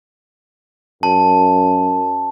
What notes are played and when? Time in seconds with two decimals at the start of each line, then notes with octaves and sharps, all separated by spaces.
1.03 F#2 A5